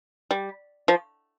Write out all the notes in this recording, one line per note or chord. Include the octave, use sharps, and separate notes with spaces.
G3
F3